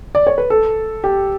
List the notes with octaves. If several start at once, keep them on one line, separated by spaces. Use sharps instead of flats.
D5
C#5
B4
A4
G4